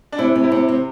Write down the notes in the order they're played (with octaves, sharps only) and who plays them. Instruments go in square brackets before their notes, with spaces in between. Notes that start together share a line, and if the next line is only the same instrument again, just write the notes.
[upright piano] D4
[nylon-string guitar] C3 [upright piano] E4
[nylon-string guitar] C3
[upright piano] E4
[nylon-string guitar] C3
[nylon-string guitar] C3 [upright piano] C4